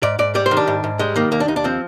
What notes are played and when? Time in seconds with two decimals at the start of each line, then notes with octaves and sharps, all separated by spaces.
0.03 G#2 D5
0.19 G#2 D5
0.35 G3 D5
0.46 C5
0.51 D#3
0.57 D4
0.68 G#2
0.84 G#2
0.99 G3 G#3
1.16 D#3 A#3
1.32 D#2 A#3
1.40 D4
1.48 D#2 D#4
1.56 D4
1.64 F3 C4